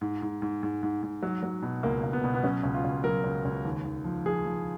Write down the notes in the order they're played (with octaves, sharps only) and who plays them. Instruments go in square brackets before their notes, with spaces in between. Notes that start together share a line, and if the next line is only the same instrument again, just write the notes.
[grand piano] G#2
G#2
G#2
G#2
G#2
G#2
F#3
F#3
B2
C#2 A#3
C#2
B3
B2
B3
F#3 C#4
C#2
F4
C#2
F#3 A#4
C#2
C#2
D#2
D#2
F3
F3 G#4
F3